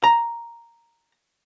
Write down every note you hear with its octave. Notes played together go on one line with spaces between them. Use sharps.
A#5